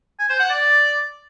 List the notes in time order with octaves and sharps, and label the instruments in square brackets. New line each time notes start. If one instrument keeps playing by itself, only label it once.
[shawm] G#5
C5
F#5
D5